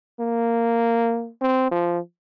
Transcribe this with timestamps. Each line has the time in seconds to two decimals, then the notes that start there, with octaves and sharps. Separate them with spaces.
0.20 A#3
1.41 C4
1.71 F3